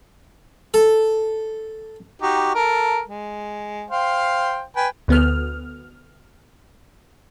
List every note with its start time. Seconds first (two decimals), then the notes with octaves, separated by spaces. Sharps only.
0.74 A4
2.22 D#4 F#4 G4
2.55 A4 A#4
3.08 G#3
3.91 C5 F5 G5
4.76 B4 G5 G#5
5.08 D2 B3 F6